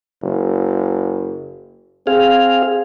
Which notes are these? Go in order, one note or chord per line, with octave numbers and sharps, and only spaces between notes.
F#1
C4 G#4 F5